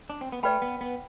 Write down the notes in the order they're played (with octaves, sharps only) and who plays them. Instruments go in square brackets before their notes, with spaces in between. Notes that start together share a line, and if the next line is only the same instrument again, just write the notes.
[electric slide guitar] D4
C4
B3
[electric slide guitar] A3 [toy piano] B4 D5 G5 B5
[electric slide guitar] B3
B3